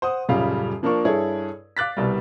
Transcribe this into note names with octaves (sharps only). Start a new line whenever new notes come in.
C5 F#5 D#6
D#1 F#2 C#3 G3 F4 F5
F3 A#3 D4 A#4 C#6
G2 E4 G#4 A4 C#5
F5 D6 F#6 A6 B6
C2 B2 G3